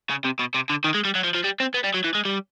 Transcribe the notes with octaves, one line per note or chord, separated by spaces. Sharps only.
C#3
C3
B2
C3
D3
D#3
G#3
G3
F#3
F3
F3
G3
C4
B3
G3
F#3
E3
G#3
G3